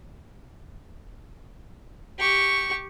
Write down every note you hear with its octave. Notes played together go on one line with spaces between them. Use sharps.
G4 C#6